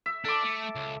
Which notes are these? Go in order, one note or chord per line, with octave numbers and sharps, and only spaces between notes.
E5
D4 A4 D6
A3
C#2